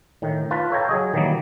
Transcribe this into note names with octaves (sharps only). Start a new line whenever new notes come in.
A2 D#3
F4 B4 A5
A4 C#5 F5 G5 A#5
F#3 G#4 D#5
D#3 E3 F#3 G3 A#3